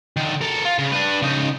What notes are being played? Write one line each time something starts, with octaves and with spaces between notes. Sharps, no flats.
D3 D#3
A4 A#4
F4
C#3
D4 B4
C#3 D#4